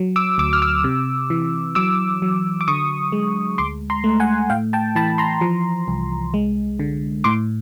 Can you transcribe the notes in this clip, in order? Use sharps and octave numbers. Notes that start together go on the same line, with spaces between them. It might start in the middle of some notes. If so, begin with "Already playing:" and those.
Already playing: F#3
D6 E6
D2 D6 E6
F6
D6 E6
C3
E3
F#3 D6 E6
F#3
D6
D3 C#6 D#6
G#3
D2 C6 D6
A#5 C6
A3
F#5 G#5
A2 F5 G5
G5 A5
E3 A5 B5
A#5 C6
F3
C2
G#3
D3
A2 C6 D6